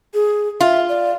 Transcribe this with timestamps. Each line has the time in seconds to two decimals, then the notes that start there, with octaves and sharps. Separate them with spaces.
0.14 G#4
0.61 F4 E5
0.89 D5